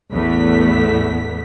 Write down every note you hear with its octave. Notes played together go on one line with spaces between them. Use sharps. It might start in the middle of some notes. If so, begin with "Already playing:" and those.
A1 E2 A3 B3 B6